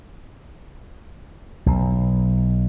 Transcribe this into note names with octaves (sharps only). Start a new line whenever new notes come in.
B1